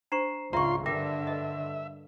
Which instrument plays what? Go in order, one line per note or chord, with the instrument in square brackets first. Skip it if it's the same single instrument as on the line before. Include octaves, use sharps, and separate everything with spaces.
[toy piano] D4 C5 C#6 [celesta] A#5 C7 E7
[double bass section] C#2 G#2 [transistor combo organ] F4 C6 [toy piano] D5 E5 [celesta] A#5 C#6
[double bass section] G2 D3 [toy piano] A#4 G5 D6 [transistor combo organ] E5 [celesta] A#6
[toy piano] B4 D#5